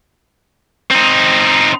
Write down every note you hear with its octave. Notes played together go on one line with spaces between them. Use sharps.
C4 D#4